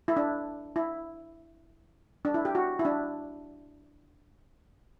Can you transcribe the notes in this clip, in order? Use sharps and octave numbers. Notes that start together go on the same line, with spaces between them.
E4
D4
E4
D4
E4
G4
F#4
E4
D4